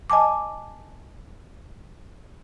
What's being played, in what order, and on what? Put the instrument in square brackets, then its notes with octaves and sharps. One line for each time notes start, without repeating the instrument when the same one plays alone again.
[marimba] D#5 G#5 A5 D6